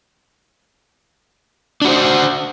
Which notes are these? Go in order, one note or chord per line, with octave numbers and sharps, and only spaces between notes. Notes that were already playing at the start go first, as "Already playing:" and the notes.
D4 F#4 C5